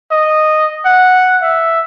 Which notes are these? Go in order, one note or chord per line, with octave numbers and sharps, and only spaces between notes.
D#5
F#5
E5